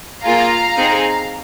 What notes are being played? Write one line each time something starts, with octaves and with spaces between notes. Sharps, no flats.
A#3 F4 G#4 F5 A#5
C4 D#4 G#4